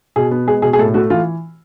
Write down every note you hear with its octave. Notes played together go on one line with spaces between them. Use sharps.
B2 G#4
B3
G#3 G#4
B2 G#4
G#4
A2 A4
A3 F#4
E3 F4